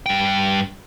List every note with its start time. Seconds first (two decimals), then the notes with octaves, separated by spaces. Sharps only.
0.06 G2 G5